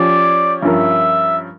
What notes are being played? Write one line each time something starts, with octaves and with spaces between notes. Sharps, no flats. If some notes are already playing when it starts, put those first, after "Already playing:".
Already playing: F3 C#4 G4 C#5 D5
G2 F3 C#4 F4 A#4 E5